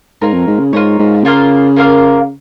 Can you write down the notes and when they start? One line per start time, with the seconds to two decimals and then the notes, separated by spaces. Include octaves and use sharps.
0.21 G#2 F4 A#4 C#5
0.33 F2
0.47 G#2
0.59 C#3
0.73 G#2 F4 A#4 C#5
0.99 G#2
1.25 C#3 A#3 F4 A#4 F5
1.76 A#3 F4 A#4 F5